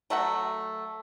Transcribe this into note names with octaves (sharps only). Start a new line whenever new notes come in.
F#3 A3 F#4 F#5